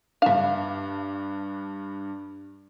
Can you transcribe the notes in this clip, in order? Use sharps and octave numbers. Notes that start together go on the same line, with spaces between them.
G2 D4 E5 F5